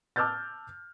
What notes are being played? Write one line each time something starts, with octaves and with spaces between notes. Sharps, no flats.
A5 D6 E6 F6 G6 A6